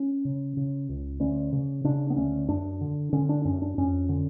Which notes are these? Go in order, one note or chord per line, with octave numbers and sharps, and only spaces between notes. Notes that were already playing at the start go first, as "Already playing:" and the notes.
Already playing: C#4
C#3
C#3
C#2
D2 C#4
C#3
C#3 D4
B3
D2 C#4
F#2 D4
D3
D3 C#4
D4
F#2 C#4
D4
F2 C#4
D3